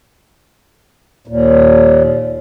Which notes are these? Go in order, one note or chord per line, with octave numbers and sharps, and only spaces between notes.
D#2 A#2